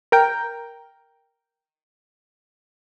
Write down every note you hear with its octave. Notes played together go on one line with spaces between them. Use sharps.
A#4 G5